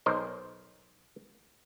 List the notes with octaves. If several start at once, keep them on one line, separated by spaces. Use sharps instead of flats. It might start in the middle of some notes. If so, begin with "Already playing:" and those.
B1 D#4 A#4 C5